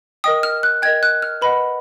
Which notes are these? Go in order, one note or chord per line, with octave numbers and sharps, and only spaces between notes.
A#4 D#5 G5 D#6
F6
F#6
A#4 D#5 G5 G#6
F#6
F6
B4 D#5 F#5 B5